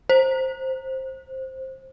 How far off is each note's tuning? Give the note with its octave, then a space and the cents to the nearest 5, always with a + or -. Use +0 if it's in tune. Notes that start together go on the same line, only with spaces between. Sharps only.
C5 +10